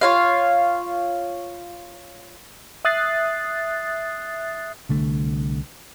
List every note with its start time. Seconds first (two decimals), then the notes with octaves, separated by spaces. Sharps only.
0.01 F4 C#5 F5
2.85 E5 D#6 F#6 A6 C7
4.89 C2 D3 A3